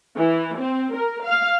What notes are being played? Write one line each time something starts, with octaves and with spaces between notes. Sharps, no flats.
E3
C4
A#4
F5